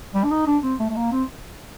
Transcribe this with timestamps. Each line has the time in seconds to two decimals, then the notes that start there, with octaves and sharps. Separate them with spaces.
0.15 G3
0.24 D4
0.31 D#4
0.47 D4
0.63 C4
0.80 A3
0.90 A3
0.96 A#3
1.12 C4